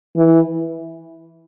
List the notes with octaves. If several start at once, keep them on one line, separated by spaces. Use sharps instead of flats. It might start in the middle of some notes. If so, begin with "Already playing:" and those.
E3